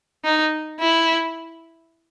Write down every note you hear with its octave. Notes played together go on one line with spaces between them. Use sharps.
D#4
E4